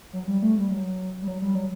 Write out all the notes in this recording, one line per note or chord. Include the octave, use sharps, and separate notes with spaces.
F#3
G3
A3
G3
F#3
G3
F#3
G3
F#3